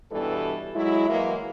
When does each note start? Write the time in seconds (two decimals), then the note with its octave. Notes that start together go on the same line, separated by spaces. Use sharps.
0.12 G2 B2 E3 G3 A4
0.75 F#3 G#3 E4
1.09 E3 F#3 G#3 A#3